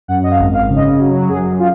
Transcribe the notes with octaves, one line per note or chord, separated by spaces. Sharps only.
F#2 F#5
D#5
F5
G#1
F5
C#3
D#5
F#3
F#2 G#4
F4